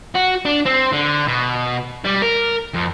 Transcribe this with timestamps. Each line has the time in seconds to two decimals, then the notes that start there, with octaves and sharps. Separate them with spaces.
0.15 F#4
0.45 D4
0.66 C4
0.93 D3
1.28 B2
2.05 G3
2.22 A#4
2.74 F2